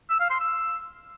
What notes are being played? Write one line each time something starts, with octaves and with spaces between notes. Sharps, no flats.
E6
F5
C6
E6